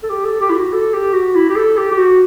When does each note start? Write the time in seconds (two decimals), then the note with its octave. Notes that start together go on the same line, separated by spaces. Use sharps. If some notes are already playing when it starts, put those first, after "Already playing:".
0.03 A4
0.10 G4
0.24 A4
0.41 G4
0.49 E4
0.56 F#4
0.72 A4
0.94 G4
1.13 F#4
1.35 E4
1.49 G4
1.56 A4
1.77 G4
1.91 G4
1.98 F#4